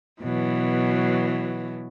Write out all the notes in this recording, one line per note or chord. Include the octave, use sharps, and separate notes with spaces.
B2 E3 F#3